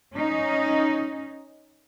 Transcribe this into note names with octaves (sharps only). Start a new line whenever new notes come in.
C#4 D#4